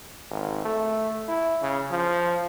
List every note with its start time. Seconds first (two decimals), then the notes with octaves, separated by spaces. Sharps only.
0.31 G#1
0.65 A3
1.28 E4
1.62 C#3
1.91 F3